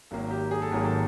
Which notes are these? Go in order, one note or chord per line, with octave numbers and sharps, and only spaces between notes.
G#1 G#2 D#3 F#3 A#3
G4
G#4
A4
G#1 G#2 D#3 F#3 A#3 G#4
A4